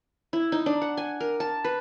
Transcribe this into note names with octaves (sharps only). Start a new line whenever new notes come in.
E4
D#4
D4
F#5
G#5
A#4
A5
B4